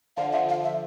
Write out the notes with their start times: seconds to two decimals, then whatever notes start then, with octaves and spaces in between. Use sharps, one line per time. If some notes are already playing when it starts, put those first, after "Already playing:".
0.17 D3 F3 F5
0.32 D3 F3 E5
0.49 F5
0.64 E5